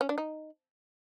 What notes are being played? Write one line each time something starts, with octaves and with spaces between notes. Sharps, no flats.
C#4
D4
D#4